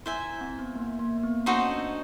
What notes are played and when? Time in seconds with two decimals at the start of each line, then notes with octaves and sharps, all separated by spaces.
0.06 E4 C5 E5 G#5
0.23 E4
0.41 C4
0.59 B3
0.76 A#3
0.99 A#3
1.18 A#3
1.23 B3
1.46 C#4 D#4 F#4 A4 C5
1.70 D4